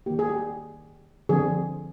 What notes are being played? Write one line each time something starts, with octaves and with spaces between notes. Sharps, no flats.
D#3 A#3 G4
G#4
G4
D3 F3 C4 G#4